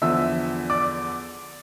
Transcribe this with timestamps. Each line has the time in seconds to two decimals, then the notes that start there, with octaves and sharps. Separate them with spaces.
0.02 E2 D3 F3 E5 E6
0.70 D5 D6